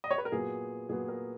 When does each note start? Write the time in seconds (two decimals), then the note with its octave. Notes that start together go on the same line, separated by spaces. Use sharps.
0.04 D#5
0.11 C#5
0.18 B4
0.25 A#4
0.32 A#2 F#3 B3 G#4
0.89 A#2 F#3 B3 G#4
1.08 A#4